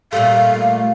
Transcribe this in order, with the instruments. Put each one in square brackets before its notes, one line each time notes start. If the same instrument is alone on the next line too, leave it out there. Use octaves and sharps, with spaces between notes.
[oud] A#2 G3 A3 [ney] F5